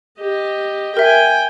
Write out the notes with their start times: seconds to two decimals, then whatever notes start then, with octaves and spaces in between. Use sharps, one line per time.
0.20 G4 D#5
0.97 A#4 E5 G5 G#5